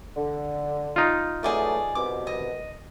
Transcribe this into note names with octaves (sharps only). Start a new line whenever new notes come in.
D3
D#4 F4
E3 F#3 A3 G#4 D5 D#5
C2 B2 D6
D#5